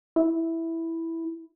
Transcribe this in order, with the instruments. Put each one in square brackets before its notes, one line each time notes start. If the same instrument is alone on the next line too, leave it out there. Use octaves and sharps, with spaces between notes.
[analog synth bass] E4